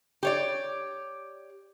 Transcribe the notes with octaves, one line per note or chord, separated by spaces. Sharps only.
G4 C#5 D5